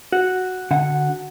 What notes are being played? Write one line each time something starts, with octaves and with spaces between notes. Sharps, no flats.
F#4
D3 F#5